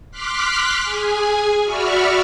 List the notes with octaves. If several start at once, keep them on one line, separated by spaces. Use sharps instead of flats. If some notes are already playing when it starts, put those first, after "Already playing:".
C6 D6 F6 F#6 B6
G#4 G#5
F#4 D5 E5 B5 C#6 F6